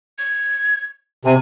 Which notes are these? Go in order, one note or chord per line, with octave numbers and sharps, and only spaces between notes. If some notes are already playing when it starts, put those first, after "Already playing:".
G#6
C3 G#5